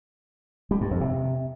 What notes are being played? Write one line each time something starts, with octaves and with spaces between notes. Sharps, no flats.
G3
G2
F2
C3